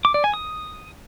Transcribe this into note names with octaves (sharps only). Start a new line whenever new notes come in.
D6
D5
G#5
D#6